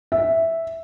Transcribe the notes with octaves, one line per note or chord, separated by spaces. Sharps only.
E5